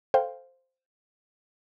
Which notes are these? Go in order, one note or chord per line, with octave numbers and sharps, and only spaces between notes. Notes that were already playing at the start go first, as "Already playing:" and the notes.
A4 C5 F5 G5